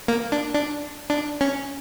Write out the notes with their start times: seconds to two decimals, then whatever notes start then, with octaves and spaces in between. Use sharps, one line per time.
0.08 A#3
0.32 D4
0.55 D4
1.10 D4
1.41 C#4